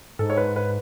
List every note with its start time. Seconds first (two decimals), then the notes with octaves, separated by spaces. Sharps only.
0.19 G#2 A4
0.30 C#5
0.37 B4
0.56 B4